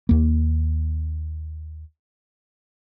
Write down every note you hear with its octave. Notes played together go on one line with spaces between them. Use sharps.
D#2 A#3